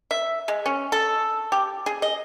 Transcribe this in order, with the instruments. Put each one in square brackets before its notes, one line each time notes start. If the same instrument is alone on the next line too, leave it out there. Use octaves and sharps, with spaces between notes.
[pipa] E5
G#3
C#4
A4
G4
G#4
D#5